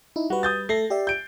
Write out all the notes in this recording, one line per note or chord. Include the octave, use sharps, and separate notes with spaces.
D#4 E4
G3 F#4 B4
D#6 G6 A6
A3 A4 A#6 C7
G4 D5 E5
G6 D7